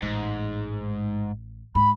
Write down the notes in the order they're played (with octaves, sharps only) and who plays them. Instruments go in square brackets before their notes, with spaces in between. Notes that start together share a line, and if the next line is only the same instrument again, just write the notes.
[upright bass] A1 [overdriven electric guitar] G#2
[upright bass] G#2 [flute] B5